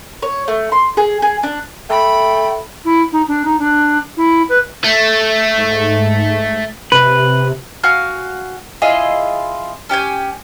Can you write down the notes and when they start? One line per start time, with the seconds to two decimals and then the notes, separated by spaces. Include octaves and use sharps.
0.22 C#5
0.48 A3
0.72 C6
0.97 G#4
1.22 G#4
1.43 D4
1.90 A3 G5 B5
2.85 E4
3.12 D#4
3.28 D4
3.45 D#4
3.59 D4
4.17 E4
4.49 B4
4.84 A3
5.58 G#2
6.92 C3 B4
7.84 F#4 F5 G#5 F6
8.82 E4 F4 G#4 D#5
9.89 C#4 G4 G5 G#5